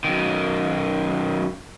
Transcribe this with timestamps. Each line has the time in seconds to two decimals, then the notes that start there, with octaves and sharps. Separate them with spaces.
0.04 F#2 D#3